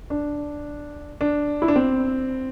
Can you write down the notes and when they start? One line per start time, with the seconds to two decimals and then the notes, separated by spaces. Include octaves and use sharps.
0.10 D4
1.21 D4
1.62 E4
1.68 D4
1.76 C4